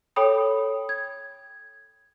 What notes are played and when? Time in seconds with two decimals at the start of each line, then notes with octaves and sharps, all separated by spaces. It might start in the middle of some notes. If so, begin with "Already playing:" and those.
0.16 A4 C#5 G5 B5 D#6
0.89 G#6